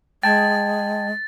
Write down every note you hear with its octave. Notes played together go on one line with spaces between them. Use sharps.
G#3 G5 A5 G#6 A6